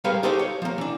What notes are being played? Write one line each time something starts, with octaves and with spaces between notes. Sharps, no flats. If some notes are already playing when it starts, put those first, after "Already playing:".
G3 G#3 A#4 B4 C#5 F5
D#4 G4 A4 C5 C#5
C#5
F3 A#3
E3 D4